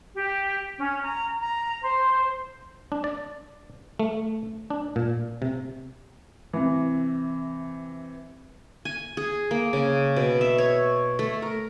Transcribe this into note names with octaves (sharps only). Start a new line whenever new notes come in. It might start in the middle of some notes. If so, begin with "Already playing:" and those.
G4
C#4
A#5
A#5
C5
D4
D5
A3
D4
A#2
C3
C3 E3
G#5
G#4
A#3
C#3
B2
E5
C#5
A3
A#4